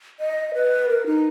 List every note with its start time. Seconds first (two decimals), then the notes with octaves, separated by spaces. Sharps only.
0.20 D#5
0.55 B4
0.89 A#4
1.06 D#4